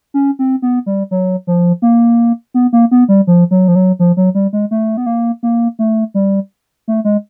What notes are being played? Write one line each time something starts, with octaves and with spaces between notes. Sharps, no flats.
C#4
C4
B3
G3
F#3
F3
A#3
B3
A#3
B3
G3
F3
F#3
F3
F#3
F3
F#3
G3
G#3
A3
B3
A#3
A#3
A3
G3
A3
G#3